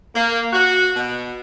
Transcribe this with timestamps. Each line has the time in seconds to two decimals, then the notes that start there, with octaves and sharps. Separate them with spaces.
0.15 A#3
0.53 F#4
0.96 B2